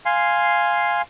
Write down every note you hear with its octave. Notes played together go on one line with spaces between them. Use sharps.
F5 G#5 C6